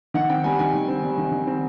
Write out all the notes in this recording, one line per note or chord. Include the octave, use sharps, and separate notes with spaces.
D#3 F#5
C4 G5
G3 G#5
D#3 G#5
D#3
C4
G3
D#3
D#3
C4